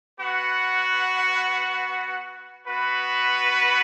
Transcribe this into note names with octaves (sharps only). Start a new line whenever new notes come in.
B3 F#4 B4 F#5
B3 F#4 B4